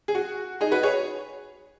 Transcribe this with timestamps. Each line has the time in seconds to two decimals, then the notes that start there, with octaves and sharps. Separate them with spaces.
0.08 G#4
0.15 F#4
0.61 D#4 G#4
0.72 F#4 B4
0.83 G#4 C#5